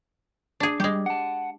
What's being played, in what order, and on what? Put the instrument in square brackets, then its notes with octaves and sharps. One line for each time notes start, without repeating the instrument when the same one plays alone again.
[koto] D4 G#4
[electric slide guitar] G3 [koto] G#3 G4
[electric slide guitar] F#5 A5